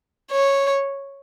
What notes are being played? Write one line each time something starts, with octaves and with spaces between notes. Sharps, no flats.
C#5